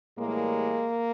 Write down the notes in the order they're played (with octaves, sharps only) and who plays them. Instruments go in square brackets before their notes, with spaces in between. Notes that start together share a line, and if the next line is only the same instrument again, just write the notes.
[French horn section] A2 E3 G3 G#3 A#3